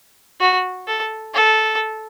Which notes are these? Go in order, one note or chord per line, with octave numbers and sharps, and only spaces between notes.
F#4
A4
A4